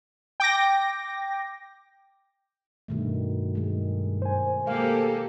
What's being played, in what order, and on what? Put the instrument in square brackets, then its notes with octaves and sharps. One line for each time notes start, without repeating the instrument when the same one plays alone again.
[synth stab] G5 D6 A#6
[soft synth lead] G2 [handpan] B2 D#3 A3
[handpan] D#3 G#3
[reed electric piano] C5 G#5
[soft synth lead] G#3 [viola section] A#3 G4 A4 [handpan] F5